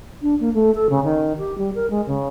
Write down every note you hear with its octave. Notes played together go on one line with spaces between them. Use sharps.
D4
A#3
A3
A4
C#3
D#3
G4
G3
A#4
G#3
C#3